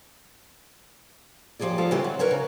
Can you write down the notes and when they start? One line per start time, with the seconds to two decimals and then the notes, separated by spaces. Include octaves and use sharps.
1.60 D#2 F3 G4 G#4 D5
1.78 F3 F4 A4 D5
1.91 C#3 E3 G3 C4 G4
2.04 F#3
2.19 A#4 B4 C#5 D5
2.31 C#3